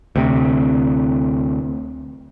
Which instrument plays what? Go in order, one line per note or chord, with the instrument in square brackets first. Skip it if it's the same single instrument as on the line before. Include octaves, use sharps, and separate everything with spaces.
[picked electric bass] D2 C3